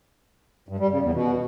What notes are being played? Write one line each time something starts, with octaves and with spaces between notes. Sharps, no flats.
G2
G3
C#3
E2
B2